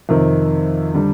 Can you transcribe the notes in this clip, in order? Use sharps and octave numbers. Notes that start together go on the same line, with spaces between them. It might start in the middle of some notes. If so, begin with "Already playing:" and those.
F2 C3 D#3
D3 G3